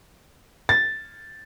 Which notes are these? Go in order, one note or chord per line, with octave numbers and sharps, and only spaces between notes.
A6